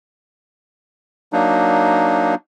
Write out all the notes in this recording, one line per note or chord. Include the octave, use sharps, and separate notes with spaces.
F#3 A#3 D4 D#4